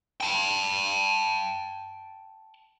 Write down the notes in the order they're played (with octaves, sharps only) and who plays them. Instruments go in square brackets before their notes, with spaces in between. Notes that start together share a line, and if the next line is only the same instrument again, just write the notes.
[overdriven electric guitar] G5 A5